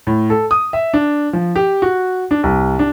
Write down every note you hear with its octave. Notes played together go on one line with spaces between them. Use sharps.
A2
A4
D#6
E5
D4
F3
G4
F#4
D4
C2
D4